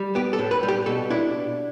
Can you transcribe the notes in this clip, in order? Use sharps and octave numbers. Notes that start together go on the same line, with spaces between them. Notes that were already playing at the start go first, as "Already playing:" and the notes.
Already playing: G3
B3 G4
A4
A2
B4
G3
G4
B2 A4
D4 E4